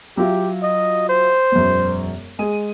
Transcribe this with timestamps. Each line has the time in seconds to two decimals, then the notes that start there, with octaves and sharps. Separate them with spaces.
0.17 F#3 F4 G4 E5
0.63 D#5
1.09 C5
1.52 E1 F#2
2.39 G#3 G#4 D#7